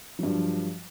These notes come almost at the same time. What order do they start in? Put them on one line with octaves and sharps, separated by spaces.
F#3 G2 F3